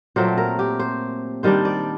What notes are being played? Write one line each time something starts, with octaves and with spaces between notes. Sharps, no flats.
A#2 F#3 A3 C4 C5
A#4
G4
C5
D#3 G3 D4 C5
D5